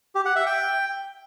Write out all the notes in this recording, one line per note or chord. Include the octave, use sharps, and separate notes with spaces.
G4
F#5
E5
G5